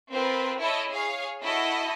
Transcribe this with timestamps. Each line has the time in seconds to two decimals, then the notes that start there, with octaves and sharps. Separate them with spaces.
0.10 C4 F4 A#4 B4
0.59 E4 A4 C#5 D#5
0.89 G#4 C#5 F5
1.42 E4 F#4 A4 D#5